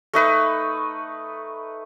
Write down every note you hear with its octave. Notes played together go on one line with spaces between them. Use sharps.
A3 D#4 B4